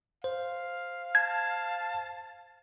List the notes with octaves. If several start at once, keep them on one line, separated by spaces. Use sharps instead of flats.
C5 F5
A5 G#6